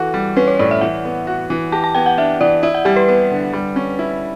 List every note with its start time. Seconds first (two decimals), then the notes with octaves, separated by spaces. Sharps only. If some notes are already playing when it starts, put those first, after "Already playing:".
Already playing: E3 F#4 A4
0.14 G3
0.36 C#4 B4
0.48 C#5
0.59 A2 D5
0.71 E5
0.81 E3 F#5
1.05 B3
1.27 F#4
1.50 E3
1.72 G4 A5
1.84 A5
1.95 B3 G5
2.06 F#5
2.18 D4 E5
2.41 E3 D5
2.63 E4 D5
2.75 F#5
2.85 G3 G4
2.96 B4
3.08 B3 B4
3.31 D3
3.53 G3
3.76 C#4
3.99 E4